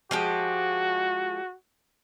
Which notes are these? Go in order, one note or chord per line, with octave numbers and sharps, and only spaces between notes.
F3 G#3 F#4 G4